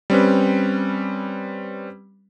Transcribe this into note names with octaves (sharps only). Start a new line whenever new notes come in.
G3 C4 C#4 B4